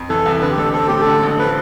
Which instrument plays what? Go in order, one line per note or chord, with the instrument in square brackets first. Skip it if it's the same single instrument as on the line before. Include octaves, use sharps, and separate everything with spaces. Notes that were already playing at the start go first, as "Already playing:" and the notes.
Already playing: [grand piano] F2
[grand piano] E3 [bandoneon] A4
[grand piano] C2
[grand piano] D3 [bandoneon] B4
[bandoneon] G4
[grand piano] A1 [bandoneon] A4
[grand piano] C4 [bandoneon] A4
[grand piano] A2 [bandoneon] G4
[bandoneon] A4
[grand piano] D3
A1
[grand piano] F3 [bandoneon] B4